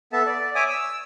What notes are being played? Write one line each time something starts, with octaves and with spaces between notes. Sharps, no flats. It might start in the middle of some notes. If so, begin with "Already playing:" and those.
B3 A4 E5 A5
D5
C#5 E5 G#5 D6 D#6
E6